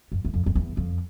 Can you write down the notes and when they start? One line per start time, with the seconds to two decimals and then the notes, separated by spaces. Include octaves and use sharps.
0.12 F#2
0.25 E2
0.34 F2
0.46 F2
0.55 E2
0.77 F2